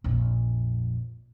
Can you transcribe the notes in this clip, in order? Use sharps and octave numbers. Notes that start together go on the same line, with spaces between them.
A#1 F2